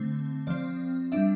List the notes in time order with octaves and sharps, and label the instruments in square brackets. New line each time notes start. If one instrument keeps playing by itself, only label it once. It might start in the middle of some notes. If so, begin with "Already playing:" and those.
Already playing: [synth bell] D3 A3 C4
F3 C4 D5
G3 D4 E5